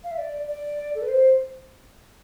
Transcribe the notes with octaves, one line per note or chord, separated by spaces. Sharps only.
F5
E5
D5
D5
A4
B4
C5